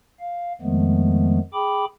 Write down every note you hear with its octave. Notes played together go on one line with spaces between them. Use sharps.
F5
F2 D#3 F3 G#3 A3 B3
G#4 G5 B5 D6